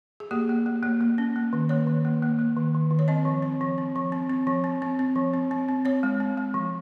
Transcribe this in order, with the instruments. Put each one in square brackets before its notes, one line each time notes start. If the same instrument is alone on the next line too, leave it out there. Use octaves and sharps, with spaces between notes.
[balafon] G#4
A#3 G4
A#3
A#3
A#3
A#3
C#4
A#3
D#3
A#3 C#5
D#3
A#3
A#3
A#3
D#3
D#3
D#3
C#5
C4 D#5
F3
C4
F3
C4
F3
C4
C4
F3
C4
C4
C4
F3
C4
C4
C4
C4 C#5
G#3
C4
G#3
F3